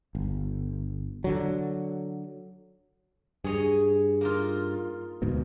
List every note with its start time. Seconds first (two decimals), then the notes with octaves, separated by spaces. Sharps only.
0.15 G1
1.24 D3 F#3
3.44 G2 G#4 C#5 D#5
4.21 A#3 D#4 F4
5.22 D2 G#2 B2